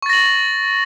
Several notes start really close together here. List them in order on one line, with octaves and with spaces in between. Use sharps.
C#6 A6 A#6 F#7